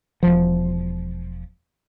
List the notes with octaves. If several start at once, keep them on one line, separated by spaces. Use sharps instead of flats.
E1 F3